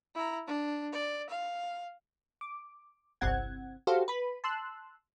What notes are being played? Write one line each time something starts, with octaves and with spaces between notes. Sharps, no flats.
E4 A#5
D4
D5
F5
D6
G1 C2 C4 F#5 G#6
F#4 G4 A4 C5 F5
B4 B5
A5 C6 E6 F#6